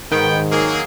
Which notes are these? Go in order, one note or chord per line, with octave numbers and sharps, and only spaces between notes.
G#2 D#3 B3 G5
F#3 A#3 G#4